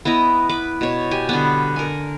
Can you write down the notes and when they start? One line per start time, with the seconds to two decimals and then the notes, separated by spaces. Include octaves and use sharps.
0.05 B3 E4 D#5 A#5
0.49 B4 D6
0.81 B2 C#5
1.11 G4 G#5
1.29 D3 G3 B3
1.76 A#4 G#5